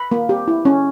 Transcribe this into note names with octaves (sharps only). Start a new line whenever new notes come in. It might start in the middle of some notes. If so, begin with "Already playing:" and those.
Already playing: B5
A#3
G4
E4
C#4